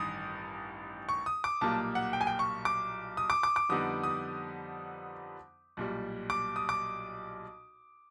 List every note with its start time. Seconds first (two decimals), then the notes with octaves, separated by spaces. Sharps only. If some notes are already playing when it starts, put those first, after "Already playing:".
Already playing: A1 G2 D#3 D#6
1.09 C#6
1.26 D#6
1.44 D6
1.61 B1 A#2 G3 A#3 A5
1.95 F#5
2.13 G5
2.21 G#5
2.27 G5
2.39 C#6
2.65 D6
3.17 D#6
3.30 D6
3.43 D6
3.56 D6
3.69 F2 D3 G3 B3 D#4 D#6
4.04 D#6
5.77 B1 A#2 G3
6.30 D6
6.56 D#6
6.69 D6